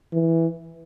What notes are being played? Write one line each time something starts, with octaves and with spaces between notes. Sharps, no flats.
E3